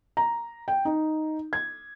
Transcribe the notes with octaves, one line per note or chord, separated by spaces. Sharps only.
A#5
G5
D#4
G#6